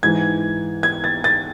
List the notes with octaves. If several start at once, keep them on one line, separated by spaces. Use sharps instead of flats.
G#2 E3 G#6
G#6
A6
A6